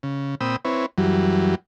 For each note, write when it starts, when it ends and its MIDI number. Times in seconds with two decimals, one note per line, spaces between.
0.03 0.35 49
0.41 0.56 46
0.41 0.56 60
0.41 0.56 79
0.41 0.56 83
0.41 0.56 87
0.41 0.56 88
0.65 0.86 60
0.65 0.86 64
0.65 0.86 71
0.65 0.86 73
0.98 1.55 42
0.98 1.55 52
0.98 1.55 54
0.98 1.55 55